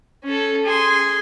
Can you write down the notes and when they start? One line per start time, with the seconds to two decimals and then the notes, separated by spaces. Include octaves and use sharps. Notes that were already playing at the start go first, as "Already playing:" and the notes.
0.24 C#4 A4
0.65 G#4 C6